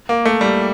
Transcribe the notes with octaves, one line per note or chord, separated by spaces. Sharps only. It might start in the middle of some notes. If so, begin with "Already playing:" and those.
A#3
A3
G3